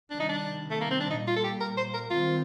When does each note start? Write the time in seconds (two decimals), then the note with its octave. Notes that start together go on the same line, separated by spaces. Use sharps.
0.11 C3 D#3 G3 D4
0.20 D#4
0.29 D4
0.71 A3
0.81 A#3
0.91 C4
1.00 D4
1.10 A#2 G3 A#3 D#4
1.28 F4
1.37 A4
1.44 G4
1.61 A#4
1.77 C5
1.94 A#4
2.11 D#3 G3 C4 F4